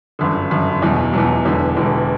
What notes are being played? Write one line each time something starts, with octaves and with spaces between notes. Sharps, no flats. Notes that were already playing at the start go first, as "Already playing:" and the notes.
G1 F#2 D3
G1 F#2 D3
E2 B2 F#3
E2 B2 F#3
E1 E2 D3
E1 E2 D3